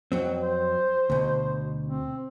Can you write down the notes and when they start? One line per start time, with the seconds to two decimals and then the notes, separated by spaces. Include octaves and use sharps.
0.12 F2 F#3 C4
0.40 C5
1.10 D2 B2
1.88 C4